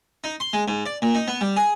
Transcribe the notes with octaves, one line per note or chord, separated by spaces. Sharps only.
D#4
C6
G#3
G#2
D5
A#2
D#4
B3
G3
G#4